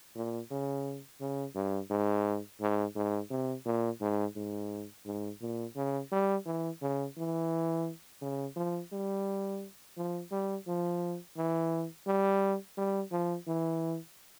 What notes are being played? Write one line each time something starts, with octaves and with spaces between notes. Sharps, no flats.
A#2
C#3
C#3
G2
G#2
G#2
G#2
C3
A#2
G#2
G#2
G#2
A#2
C#3
G3
E3
C#3
E3
C#3
F3
G3
F3
G3
F3
E3
G3
G3
F3
E3